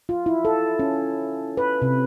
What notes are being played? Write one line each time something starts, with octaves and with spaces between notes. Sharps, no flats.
F4
E4
A4
C#4
B4
C3